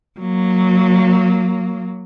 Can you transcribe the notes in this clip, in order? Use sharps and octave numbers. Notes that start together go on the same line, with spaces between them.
F#3 A#3